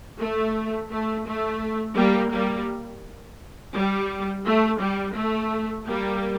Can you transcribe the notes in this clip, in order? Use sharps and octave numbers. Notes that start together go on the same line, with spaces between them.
A3
A3
A3
G3 A#3
G3 A#3
G3
A3
G3
A3
G3 A#3